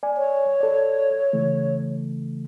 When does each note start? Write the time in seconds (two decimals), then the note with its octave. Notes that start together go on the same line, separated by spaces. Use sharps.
0.03 D5 G#5
0.17 C#5
0.61 A4 D5
1.33 C#3 E3 A3